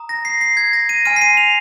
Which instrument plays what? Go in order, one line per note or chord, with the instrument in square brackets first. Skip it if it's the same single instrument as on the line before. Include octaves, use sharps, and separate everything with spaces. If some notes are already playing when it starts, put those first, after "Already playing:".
Already playing: [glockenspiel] A#5 D#6
A#6
C7
C7
G#6
A#6
D#7
G#5 C6 F6 D#7
C7
D#7
F7